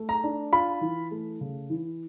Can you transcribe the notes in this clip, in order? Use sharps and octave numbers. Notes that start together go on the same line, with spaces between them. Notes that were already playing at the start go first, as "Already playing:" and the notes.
Already playing: A3
A#5
D4
F4 B5
E3
A3
C#3
E3